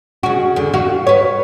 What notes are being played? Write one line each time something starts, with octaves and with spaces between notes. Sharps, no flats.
C#3 F#4
E2 D3
F4 F#4
B4 C#5